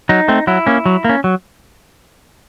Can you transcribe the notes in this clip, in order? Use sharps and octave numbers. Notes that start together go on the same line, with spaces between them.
F#3 D#4
A3 C4
F#3 E4
A#3 C#4
F#3
A#3 C#4
F#3